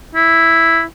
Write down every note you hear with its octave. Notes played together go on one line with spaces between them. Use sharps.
E4